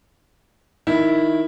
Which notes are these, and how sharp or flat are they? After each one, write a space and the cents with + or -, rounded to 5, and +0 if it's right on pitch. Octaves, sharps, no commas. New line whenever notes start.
D#3 +0 E4 -5